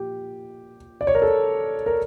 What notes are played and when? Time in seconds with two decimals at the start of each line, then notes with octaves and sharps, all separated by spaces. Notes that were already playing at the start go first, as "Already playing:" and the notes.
Already playing: A#2 F3 G4
1.01 D5
1.07 C#5
1.15 A#4
1.22 A4
1.86 A#4